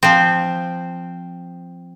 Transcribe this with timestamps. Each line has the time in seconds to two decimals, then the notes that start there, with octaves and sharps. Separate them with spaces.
0.03 F3 C4